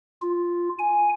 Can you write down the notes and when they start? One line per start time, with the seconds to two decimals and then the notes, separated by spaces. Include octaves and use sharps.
0.22 F4
0.79 G#5